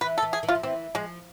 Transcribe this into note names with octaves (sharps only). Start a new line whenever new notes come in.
E3 B4
A4
E3
G#4
E3
F4
F3
E3 C4
F3 G#3